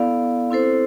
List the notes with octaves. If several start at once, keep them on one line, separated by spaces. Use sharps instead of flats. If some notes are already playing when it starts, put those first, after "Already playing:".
Already playing: B3 E4 A4 D5 F5
C4 E4 A4 C5